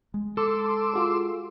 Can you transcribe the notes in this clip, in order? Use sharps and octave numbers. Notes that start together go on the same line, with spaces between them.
G#3
A4 C6 D6 E6
F4 F#4 G#4